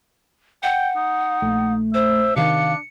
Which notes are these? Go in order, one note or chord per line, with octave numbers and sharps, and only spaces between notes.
F#5 G5
D#4
A#1 A3
C5 E5
C3 D#3 D4 F5 C#7